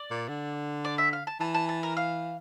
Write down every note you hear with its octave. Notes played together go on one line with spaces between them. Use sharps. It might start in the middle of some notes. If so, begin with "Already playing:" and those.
Already playing: D5
A#2
D3
D5
E5
F5
A5
E3 A5
A5
A5
A#4
F5